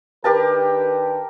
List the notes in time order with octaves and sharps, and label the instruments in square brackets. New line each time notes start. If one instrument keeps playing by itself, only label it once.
[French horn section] D#3 D4 B4 [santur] G4 A#4 A5